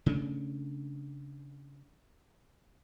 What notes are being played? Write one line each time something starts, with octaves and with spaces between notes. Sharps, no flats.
C#3 A3 C#4 D4